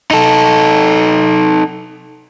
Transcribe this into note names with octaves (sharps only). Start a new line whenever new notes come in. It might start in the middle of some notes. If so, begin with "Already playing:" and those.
D#4 A4